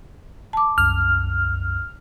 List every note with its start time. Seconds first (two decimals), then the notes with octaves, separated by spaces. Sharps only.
0.53 A5 D6
0.78 C2 F#2 F6